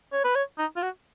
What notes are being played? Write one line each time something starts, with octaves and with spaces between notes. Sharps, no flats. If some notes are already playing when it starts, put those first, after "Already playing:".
C#5
B4
C#5
D#4
F4
F#4